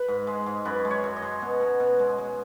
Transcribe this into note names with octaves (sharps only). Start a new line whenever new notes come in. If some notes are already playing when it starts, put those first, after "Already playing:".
Already playing: B4
G#2
G#3
G#2
F#2 B4
G#3
C#5
F#2
D#5
G#3
B2
B2
B2
G#3
G#3